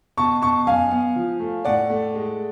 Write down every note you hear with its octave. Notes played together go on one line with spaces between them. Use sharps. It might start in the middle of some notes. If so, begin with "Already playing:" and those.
B2 A5 C#6
B2 A5 C#6
F#2 F5 G#5
B3
F3
A3
A2 D5 F#5
A3
G#3